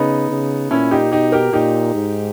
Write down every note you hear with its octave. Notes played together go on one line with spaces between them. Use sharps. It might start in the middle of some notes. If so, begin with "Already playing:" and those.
Already playing: C#3 B3 D#4
C#3
A#2 C#4 E4
D#4 G4
B2 D#4 G4
G4 A#4
A#2 D#4 G4
G#2